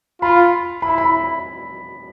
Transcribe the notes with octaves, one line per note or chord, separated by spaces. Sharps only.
F4 B5
E4 B5
B5